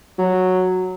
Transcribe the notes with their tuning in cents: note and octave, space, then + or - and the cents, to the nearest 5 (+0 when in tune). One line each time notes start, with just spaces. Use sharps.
F#3 -5